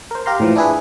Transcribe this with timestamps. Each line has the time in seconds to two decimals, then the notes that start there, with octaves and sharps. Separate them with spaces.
0.11 A#4 C5
0.26 G4 F5 A#5 C6
0.40 A2 E3 F3
0.56 D4 E4 G#4 B4